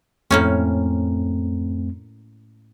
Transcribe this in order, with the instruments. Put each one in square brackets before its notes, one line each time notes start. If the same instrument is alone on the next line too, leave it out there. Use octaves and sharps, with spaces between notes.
[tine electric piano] F2 A3 C4 [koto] A2 A#3 C#4